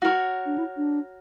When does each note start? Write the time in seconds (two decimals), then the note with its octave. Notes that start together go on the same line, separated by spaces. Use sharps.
0.02 E4 F#4
0.05 A#4 C#5
0.46 D4
0.58 E4
0.77 D4